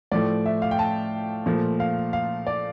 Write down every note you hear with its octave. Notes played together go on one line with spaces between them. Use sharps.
A2 F3 A3 D5
E5
F5
G5
A5
A#2 F3 A3
F5
F5
D5